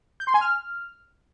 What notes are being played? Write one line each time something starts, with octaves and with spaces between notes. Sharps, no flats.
G6
C6
G#5
F6